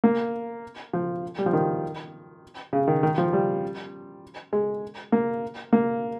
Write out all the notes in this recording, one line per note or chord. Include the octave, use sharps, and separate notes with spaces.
A#3
F3
G3
F3
D#3
C#3
D#3
D#3
F3
G3
G#3
A#3
A#3